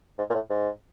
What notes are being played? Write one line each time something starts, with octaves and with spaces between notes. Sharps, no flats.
G#2
A#2
A2
G#2